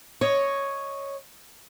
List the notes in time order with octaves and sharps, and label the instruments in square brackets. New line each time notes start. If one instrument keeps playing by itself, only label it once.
[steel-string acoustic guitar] C#5 D#5